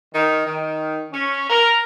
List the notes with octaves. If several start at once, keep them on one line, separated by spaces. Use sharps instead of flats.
D#3
D#3
C#4
A#4